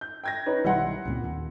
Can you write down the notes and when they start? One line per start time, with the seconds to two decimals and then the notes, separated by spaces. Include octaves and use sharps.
0.01 G6
0.24 G5 G#6 A#6
0.46 C#4 D#4 B4
0.64 B1 D#3 G3 E4 F#5 C6
1.05 C#2 A#2 C4
1.24 D#2